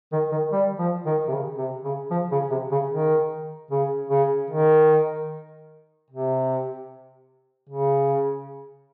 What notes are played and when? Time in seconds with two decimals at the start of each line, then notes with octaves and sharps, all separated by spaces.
0.12 D#3
0.32 D#3
0.52 G3
0.79 F3
1.06 D#3
1.28 C3
1.32 C#3
1.58 C3
1.85 C#3
2.11 F3
2.32 C#3
2.51 C3
2.72 C#3
2.92 D#3
3.71 C#3
4.10 C#3
4.51 D#3
6.10 C3
7.70 C#3